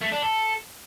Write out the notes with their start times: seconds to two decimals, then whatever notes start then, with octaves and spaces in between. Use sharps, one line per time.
0.01 A3
0.12 D4
0.22 A4